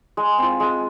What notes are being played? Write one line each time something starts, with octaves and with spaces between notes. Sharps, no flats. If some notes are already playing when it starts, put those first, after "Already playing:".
G#3
C4 F4
G#3